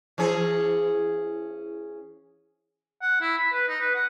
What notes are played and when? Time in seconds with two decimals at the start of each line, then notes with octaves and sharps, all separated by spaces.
0.18 E3 C#4 G#4
3.02 F#5
3.21 E4
3.38 B5
3.53 B4
3.68 D#4
3.81 B4
3.95 F#5